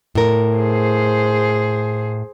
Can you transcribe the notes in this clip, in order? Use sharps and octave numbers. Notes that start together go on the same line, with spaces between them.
A2 A#4
G#4 C5